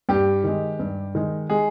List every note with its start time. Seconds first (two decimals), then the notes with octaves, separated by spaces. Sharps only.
0.09 G2 G4 G5
0.44 D#3 G#3
0.79 G2
1.15 D#3 G#3
1.50 G#3 G#4